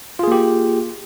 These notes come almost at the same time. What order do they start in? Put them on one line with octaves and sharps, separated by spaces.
F4 G#4 A#3 G4